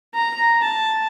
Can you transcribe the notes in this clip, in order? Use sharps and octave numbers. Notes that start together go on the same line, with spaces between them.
A#5
A5